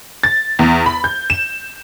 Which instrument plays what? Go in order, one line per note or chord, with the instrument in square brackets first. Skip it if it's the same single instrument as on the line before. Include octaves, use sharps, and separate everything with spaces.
[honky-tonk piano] A6
E2
B5
G6
E7